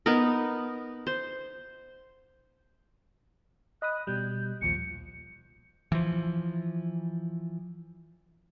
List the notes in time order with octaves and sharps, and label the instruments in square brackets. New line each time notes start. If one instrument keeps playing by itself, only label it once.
[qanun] B3 D#4 A#4
C5
[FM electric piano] D#5 B5 D#6 [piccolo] F#6
[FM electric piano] B2 G3 [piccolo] G6
[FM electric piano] A#1 D#2 F3 [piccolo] C#7
[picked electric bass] E3 F3